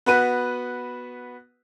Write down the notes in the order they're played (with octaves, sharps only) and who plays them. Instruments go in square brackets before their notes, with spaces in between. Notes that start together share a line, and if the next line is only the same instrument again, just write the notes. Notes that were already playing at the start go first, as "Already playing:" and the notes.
[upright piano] B3 F#4 B4 D#7